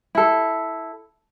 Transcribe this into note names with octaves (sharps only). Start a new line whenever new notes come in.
E4 A4